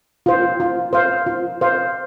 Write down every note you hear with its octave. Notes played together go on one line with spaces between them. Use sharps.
F4 C5
F4
C5 F5
F4
C5 F5